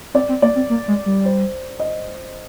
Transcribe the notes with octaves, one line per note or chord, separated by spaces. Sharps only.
C4 D5
C4
A#3 D5
C4
A#3
G#3
G3
C5
D#5